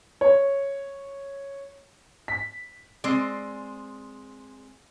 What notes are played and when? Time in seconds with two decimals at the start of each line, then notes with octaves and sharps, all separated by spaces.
0.21 C#5
2.28 B6
3.04 G#3 C4 D5